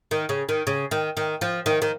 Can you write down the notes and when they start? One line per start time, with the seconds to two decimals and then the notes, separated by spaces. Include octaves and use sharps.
0.11 D#3
0.29 C#3
0.49 D#3
0.67 C#3
0.91 D#3
1.17 D#3
1.41 F3
1.66 D#3
1.82 D#3